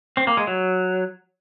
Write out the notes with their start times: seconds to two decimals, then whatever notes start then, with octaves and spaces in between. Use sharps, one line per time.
0.17 C4
0.27 A#3
0.37 G#3
0.47 F#3